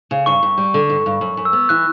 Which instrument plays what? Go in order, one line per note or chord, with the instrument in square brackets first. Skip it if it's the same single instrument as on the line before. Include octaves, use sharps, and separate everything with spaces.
[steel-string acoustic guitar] C#3
[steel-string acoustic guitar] G2 [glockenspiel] C#6
[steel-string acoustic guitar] G2
G3
D3
G2
G2
F#2
F#2
[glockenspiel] E6
[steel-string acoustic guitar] B3
[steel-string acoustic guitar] E3 [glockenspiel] F#6